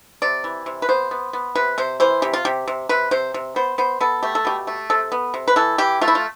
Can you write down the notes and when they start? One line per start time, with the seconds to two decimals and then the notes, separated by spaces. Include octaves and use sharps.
0.22 C3 D5
0.44 E3
0.66 C3
0.82 B4
0.89 B3 C5
1.11 B3
1.33 B3
1.55 C3 B4
1.78 C3 C5
2.00 E3 C5
2.22 C3 G4
2.33 F4
2.45 C3 G4
2.68 C3
2.89 C3 B4
3.11 C3 C5
3.34 C3
3.56 B3 C5
3.78 B3 C5
4.01 B3 A4
4.23 A3 G4
4.35 A4
4.45 B2 G4
4.67 A3
4.90 C3 A4
5.12 B3
5.34 C3
5.48 B4
5.56 E3 A4
5.78 E3 G4
6.01 A3 F4
6.08 E4
6.15 F4